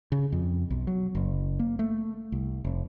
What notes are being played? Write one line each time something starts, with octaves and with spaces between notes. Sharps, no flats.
C#3
F2
B1
F#3
F#1
A#3
A3
C2
F1